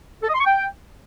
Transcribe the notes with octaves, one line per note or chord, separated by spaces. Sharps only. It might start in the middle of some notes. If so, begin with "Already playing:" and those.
A4
D#5
C6
C#6
G5